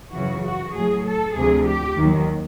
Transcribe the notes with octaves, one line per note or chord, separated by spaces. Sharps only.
F#2 C#3 E3 F#4
F#4
A2 F#3 G#4
A4
D2 C3 F3 G#4
G4
D#2 D#3 F#3